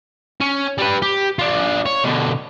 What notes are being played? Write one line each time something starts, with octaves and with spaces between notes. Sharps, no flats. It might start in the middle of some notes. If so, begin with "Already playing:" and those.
C#4
G3 B4
G4
D4 F4
C#5
B2 D3